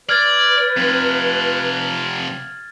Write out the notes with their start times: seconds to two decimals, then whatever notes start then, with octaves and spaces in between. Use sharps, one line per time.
0.09 B4 D5 F6 G#6 A6
0.77 C3 F3